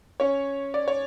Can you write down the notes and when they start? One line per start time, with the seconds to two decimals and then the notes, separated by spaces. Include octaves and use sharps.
0.20 C#4 C#5
0.74 D5
0.88 C#5